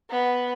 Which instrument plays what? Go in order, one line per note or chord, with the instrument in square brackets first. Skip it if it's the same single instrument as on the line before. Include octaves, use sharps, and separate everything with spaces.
[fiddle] B3